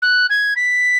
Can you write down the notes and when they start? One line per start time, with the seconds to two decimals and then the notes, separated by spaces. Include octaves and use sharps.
0.02 F#6
0.30 G#6
0.56 B6